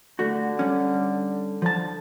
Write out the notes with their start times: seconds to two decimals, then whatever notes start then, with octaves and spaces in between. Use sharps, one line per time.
0.19 D3 A3 F#4
0.59 G3 C#4
1.62 D3 F3 A5